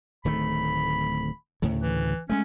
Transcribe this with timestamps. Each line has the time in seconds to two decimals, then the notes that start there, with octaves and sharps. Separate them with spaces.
0.25 D1 D#3 A3 B5
1.62 D2 A2 C#3
1.81 E3
2.30 G#3 A3 C#4